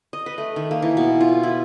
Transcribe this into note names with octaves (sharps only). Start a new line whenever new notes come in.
D#5
B4
A3
D#3
A#3
E3
B2
F4
E4